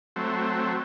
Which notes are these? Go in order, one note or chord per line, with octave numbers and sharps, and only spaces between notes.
F#3 A3 C4